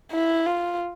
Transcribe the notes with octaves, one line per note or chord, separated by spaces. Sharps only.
E4
F4